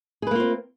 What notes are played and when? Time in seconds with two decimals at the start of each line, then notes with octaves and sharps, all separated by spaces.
0.22 G#4
0.27 B4
0.31 A#3
0.35 F4
0.40 C4